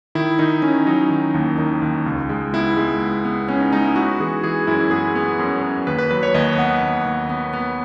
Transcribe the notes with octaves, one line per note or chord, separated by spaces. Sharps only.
D#3 E4
D#3 D#4
D#3 C#4
F#3 D#4
D#3
D#2
D#3 D#4
D#2
C#2
G#3
B3 E4
G#3
B3
B3
B3 C#4
D#4
G#3 D#4
E4
B3 F#4
E3 G#4
E3 G#4
F#2 E4
B3 G#4
B3
F#2
F#2
D#2 B4
B4
F#3 B4
C#5
D#2 D#5
B3 F#5
D#2
D#2
B3
B3